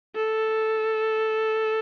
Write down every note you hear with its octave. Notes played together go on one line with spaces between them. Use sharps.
A4